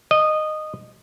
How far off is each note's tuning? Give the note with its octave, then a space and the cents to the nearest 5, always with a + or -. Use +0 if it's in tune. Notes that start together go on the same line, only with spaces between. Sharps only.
D#5 -15